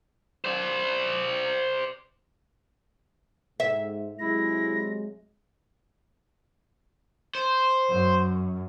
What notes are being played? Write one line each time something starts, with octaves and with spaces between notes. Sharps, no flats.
C5 D5
G#2 E5
C3 F#3 G#3 E4 A#6
C5
F#2